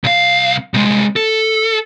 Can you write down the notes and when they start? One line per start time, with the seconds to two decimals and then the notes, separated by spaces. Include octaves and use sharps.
0.04 C2 F5
0.74 C2 G#3
1.16 A4